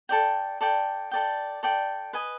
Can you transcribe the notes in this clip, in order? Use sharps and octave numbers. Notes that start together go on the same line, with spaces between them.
A4 D5 G5
A4 D5 G5
A4 D5 G5
A4 D5 G5
B4 D#5 G#5